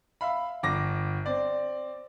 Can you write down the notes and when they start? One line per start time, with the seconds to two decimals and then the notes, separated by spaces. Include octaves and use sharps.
0.21 E5 F5 B5
0.63 G1 D6 A#6
1.26 C4 D5